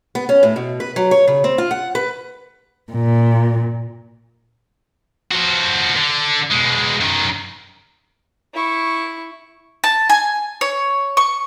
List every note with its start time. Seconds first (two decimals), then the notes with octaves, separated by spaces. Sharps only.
0.15 B3
0.29 C#4
0.43 A2
0.56 B2
0.80 B4
0.96 F#3
1.11 C#5
1.28 C#3
1.44 C4
1.58 F4
1.71 F#5
1.95 B4
2.93 A#2
5.31 F3 F#4
5.97 D3
6.50 B2 G#3
7.00 F#2 D#3
8.55 E4 C#6
9.84 A5
10.10 G#5
10.61 C#5
11.17 C#6